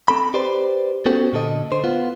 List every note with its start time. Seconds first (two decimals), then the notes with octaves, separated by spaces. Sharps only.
0.08 C4 A4 B5
0.34 G4 B4 C5 D5
1.06 B3 C#4 F#4 G4 A4 C5
1.33 A#2 D3 A4 D#5
1.72 D3 C5
1.84 B3 F4